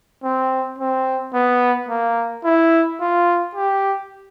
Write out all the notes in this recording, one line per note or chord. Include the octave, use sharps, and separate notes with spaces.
C4
C4
B3
A#3
E4
F4
G4